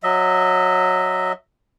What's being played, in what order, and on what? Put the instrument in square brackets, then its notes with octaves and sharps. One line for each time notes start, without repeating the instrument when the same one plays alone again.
[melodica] F#3 D#5 E5